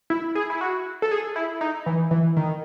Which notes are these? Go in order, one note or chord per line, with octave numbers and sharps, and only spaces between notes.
E4
G#4
E4
F#4
A4
G#4
E4
D#4
E3
E3
D#3